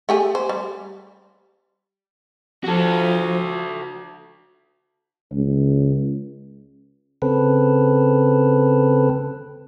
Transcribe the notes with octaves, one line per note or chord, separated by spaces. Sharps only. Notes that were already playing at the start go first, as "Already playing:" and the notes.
A3 G4 G#4
C5
G3
F3 F#4 A4
C#2
C#3 C4 A4 B4